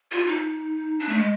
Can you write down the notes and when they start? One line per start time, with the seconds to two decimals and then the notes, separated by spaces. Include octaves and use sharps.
0.12 F4
0.27 D#4
1.00 D4
1.09 A3
1.18 G#3